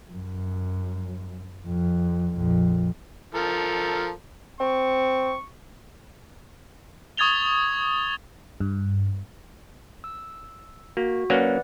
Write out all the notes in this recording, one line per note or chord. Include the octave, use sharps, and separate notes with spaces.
F#2
F2
A#1 F2
F3 A4 A#4
C4 C#6
C#6 D#6 G#6 A6 F7 G7
G2
E6
A#3 F#4
F#3 A#3 C#4 B4 D5 F#5